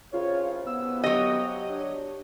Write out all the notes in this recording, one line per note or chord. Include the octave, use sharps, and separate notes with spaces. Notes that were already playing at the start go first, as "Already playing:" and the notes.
C2 C#3 F4 C#5
B3 E6
F#3 G4 D#5
D4 C#5